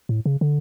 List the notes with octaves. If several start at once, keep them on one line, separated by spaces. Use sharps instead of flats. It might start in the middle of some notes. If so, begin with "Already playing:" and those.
A2
C#3
D3